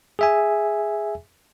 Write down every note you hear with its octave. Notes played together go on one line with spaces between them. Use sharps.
G#4 E5 G#5